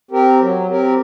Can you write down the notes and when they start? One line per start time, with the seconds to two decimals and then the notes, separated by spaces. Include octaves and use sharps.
0.11 C4 G4 A#4
0.39 F#3
0.67 C4 G4 A#4